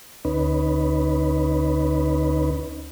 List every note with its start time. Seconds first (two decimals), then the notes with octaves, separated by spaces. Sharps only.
0.25 D2 C#4 D#4 B4